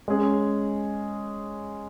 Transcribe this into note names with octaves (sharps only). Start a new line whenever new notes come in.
G#3 C#4 G#4